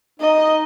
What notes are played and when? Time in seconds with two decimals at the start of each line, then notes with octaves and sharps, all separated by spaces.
0.20 D#4 D#5